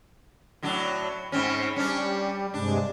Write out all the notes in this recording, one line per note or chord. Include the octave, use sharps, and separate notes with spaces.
A2 F#3 D4
G#2 C4 C#4
G3 C#4 D4
G2 C3 G#3 D4